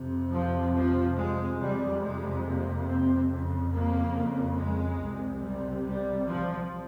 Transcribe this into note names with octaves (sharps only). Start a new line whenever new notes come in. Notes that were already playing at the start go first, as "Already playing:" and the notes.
Already playing: F2 C3
F3
F3
G#3
F2 C3 G3
G#3
A#3
C4
F2 C#3
A#3
G#3
C2 C3
G3
G3
F3